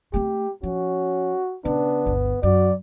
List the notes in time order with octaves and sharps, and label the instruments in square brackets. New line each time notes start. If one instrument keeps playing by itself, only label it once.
[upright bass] A3 C4 [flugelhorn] G4
[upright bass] F3 [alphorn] C#4 [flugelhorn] F#4
[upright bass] C#3 [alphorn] B3 [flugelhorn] D4
[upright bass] G1 D2
[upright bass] F#2 [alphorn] F#4 [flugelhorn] D5